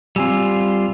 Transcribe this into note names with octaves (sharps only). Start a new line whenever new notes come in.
G3 C4 F4 G#5 E6